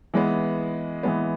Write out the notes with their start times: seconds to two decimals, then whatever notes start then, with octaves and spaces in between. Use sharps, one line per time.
0.14 E3 G#3 B3
1.03 E3 G#3 B3